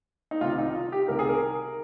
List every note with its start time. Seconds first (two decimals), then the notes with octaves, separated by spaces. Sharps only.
0.31 D#4
0.41 C2 C3 D#3 F4
0.58 D#4
0.75 F4
0.92 G4
1.08 C2 C3 D#3 A#4
1.19 G#4
1.29 A#4